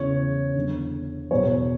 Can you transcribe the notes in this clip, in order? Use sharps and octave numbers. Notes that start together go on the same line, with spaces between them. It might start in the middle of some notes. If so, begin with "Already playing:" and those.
Already playing: E2 C#3 E3 C#5
E2 D3
E2 B2 C#5